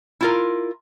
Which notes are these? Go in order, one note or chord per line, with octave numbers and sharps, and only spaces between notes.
E4 F4 A#4